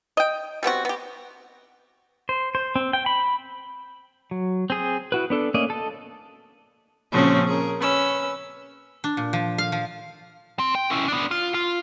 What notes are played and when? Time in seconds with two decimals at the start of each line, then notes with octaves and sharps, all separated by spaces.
0.17 D#5 G5
0.63 G3 B3 C4 F#4
0.85 B3 G4
2.29 C5
2.55 C5
2.76 C4
2.93 G5
3.06 B5
4.31 F#3
4.70 C4 G#4 D#6
5.12 E4 F#4 B4
5.30 B3 D4 A4
5.54 A3 A#3 C#4 D5 D#5
5.70 A4 D#5
7.12 A#2 C#3 F3 C4 C#4 F#4
7.47 G#4 A#4
7.79 C#4 B4 E6
9.04 D4
9.17 A#2
9.33 F3
9.58 F5
9.72 F3
10.59 C4
10.75 G5
10.90 C#4 E4
11.08 B3 D4
11.31 F4
11.54 F4